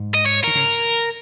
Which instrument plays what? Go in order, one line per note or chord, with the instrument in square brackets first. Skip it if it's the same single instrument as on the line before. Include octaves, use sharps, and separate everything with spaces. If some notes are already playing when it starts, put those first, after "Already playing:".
Already playing: [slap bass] G#2
[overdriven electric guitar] D#5
C#5
[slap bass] D#3 [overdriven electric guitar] A#4
[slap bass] C#3